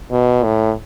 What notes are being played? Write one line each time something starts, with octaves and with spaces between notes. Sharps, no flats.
B2
A2